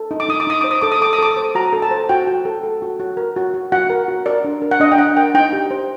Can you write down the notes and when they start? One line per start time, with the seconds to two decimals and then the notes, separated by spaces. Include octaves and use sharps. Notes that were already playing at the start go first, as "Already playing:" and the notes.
Already playing: A4
0.11 D#4
0.20 D6
0.29 D#4 D#6
0.40 D6
0.47 D#4 D#6
0.61 C5 D6
0.71 D#6
0.82 A4 D6
0.92 D#6
1.01 A4 D6
1.13 D#6
1.18 A4 D6
1.37 C5
1.55 F#4 A#5
1.73 A4
1.82 A5
1.91 C5
2.09 F#4 G5
2.27 F#4
2.45 A4
2.63 A4
2.82 F#4
3.00 F#4
3.17 A#4
3.36 F#4
3.54 F#4
3.72 F#4 F#5
3.90 A#4
4.08 F#4
4.26 A#4 D5
4.45 D4
4.62 A#4
4.71 F#5
4.80 D4 D#5
4.92 G5
4.98 D4 F#5
5.17 A#4 G5
5.34 D#4 G5
5.53 G4
5.71 C5